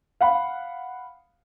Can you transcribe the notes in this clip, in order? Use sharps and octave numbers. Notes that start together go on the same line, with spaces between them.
F5 F#5 B5